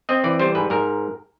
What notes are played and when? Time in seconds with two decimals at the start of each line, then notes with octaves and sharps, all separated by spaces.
0.09 C4 D#5
0.24 E3 D5
0.40 G3 C5
0.55 G#2 B4
0.70 G#2 A#4